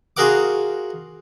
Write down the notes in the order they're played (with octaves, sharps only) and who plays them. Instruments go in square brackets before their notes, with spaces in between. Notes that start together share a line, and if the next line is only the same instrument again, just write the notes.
[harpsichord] F4 F#4 G#4 A#4 F#5 D6